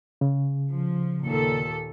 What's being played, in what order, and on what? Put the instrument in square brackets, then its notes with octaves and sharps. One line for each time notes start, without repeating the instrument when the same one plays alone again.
[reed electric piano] C#3
[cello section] F3
D#2 A#2 A4